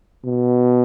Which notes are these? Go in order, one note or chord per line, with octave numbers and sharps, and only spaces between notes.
B2